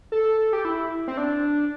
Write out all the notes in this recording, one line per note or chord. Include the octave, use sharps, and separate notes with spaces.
A4
G4
E4
C4
D4